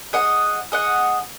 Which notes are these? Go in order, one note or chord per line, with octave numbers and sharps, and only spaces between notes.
G#4 D#5 F#5
G#4 D#5 F#5